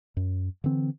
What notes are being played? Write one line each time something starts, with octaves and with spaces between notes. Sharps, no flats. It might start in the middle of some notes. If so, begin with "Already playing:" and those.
F#2
D3 E3 C4